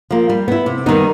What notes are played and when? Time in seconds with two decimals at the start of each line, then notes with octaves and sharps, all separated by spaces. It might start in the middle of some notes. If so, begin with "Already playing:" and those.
0.11 F3 A#3
0.29 G3
0.48 B3 E4
0.66 C3
0.86 D#3 G3 B3 D#4